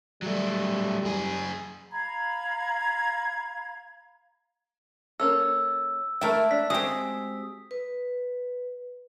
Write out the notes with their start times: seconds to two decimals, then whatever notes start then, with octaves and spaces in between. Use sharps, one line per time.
0.22 F#3 G3 A3
1.05 F#2 G#4
1.91 F5 A#5 B5 G#6
5.20 A#3 C#4 A4 E6
6.21 A3 E4 A#4 G5
6.51 D4 B6
6.70 G#3 C4 F#4 G4 D#6
7.71 B4